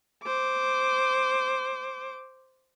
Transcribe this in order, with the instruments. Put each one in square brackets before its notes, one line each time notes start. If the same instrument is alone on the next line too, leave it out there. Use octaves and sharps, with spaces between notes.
[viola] C5 D6